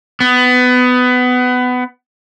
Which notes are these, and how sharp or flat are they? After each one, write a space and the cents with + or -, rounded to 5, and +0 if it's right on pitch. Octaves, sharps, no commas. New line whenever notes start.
B3 +20